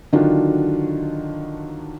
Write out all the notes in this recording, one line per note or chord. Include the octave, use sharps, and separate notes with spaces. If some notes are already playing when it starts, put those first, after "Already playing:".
D3 D#3 F#3 D4 F4 F#4